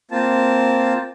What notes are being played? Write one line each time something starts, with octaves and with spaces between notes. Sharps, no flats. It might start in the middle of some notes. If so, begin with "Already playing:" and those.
A#3 C4 F4 A5